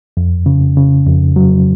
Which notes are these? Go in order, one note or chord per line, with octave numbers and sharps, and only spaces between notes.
F2
C#3
C#3
F2
F#3